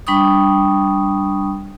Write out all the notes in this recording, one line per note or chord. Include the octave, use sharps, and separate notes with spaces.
G3 D4 G5 B5 C#6 D#6